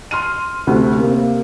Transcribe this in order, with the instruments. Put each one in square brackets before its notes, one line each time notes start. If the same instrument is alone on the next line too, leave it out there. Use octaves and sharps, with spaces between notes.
[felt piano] C6 F6 D#7
D2 C3 A3
[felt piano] C3 [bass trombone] A#3